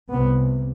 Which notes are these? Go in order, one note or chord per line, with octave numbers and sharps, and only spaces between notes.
C2 C3 B3